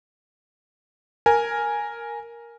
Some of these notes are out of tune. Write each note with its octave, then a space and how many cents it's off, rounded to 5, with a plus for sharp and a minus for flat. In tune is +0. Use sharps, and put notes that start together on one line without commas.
A#4 +0 G#5 +0